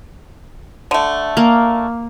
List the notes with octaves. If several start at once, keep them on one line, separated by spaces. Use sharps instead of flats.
D3 A3
A#3